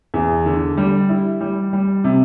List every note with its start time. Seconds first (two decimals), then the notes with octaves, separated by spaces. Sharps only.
0.14 E2
0.46 D3
0.77 G3
1.09 E4
1.41 G3
1.73 G3
2.04 C3